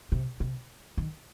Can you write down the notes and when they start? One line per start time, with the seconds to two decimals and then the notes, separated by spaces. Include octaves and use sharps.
0.12 C3
0.40 C3
0.98 D#3